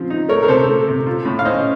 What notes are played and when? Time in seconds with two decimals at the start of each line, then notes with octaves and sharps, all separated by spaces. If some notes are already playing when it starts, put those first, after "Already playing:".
Already playing: C#3 F3 C4
0.10 D#4
0.29 A3 A#4 C#5
0.43 A#4
0.48 C3 A4 C5
0.67 A3
0.88 C3
1.07 F4
1.25 A2
1.39 F5
1.45 C#4 C5 D#5